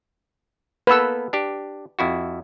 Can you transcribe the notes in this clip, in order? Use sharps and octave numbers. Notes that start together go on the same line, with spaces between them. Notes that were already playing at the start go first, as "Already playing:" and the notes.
A#3 B3 A4 B4 E6
D4 G4
F2 E4 F#4